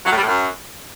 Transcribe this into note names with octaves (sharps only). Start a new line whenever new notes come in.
F#3
A2
G3
A2
F#2